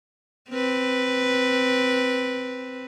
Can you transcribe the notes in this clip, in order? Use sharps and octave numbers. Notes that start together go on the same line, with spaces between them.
C4 B4